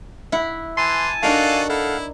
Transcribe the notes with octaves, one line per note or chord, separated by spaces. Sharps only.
E4 F#5
E3 G#5 A5 C6
D4 D#4 F#4 A4 A#4 D5 F5
E4 A4 F5 F#5